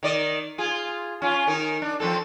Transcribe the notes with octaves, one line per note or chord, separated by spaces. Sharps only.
D#3 D5 D#5
F4 G#4
C#4 F4
D#3 D#4 A#4
D4
F3 C4 A4